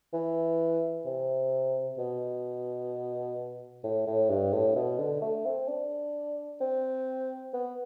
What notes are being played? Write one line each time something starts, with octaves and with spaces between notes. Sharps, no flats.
E3
C3
B2
A2
A2
G2
A2
B2
D3
A3
C4
D4
C4
B3